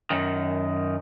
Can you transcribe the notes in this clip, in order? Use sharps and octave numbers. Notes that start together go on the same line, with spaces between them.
F#2 D#3